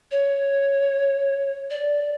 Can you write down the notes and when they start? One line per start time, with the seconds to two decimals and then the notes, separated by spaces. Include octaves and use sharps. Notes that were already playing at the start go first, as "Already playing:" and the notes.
0.11 C#5
1.70 D5